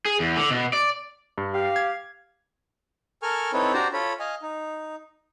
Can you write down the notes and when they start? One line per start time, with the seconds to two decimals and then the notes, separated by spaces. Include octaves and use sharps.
0.05 G#4
0.20 E2
0.37 D3
0.51 B2
0.73 D5
1.38 G2
1.53 G4 F5
1.76 G#6
3.22 A4 A#4 G#5 C#6 F6
3.53 C4 D#4 E4 A4 B4 C#5
3.73 D4 F#4 G4 C5 D5 A#5
3.93 F4 A4 C#5 B5
4.19 D#5 F5 G#5
4.42 D#4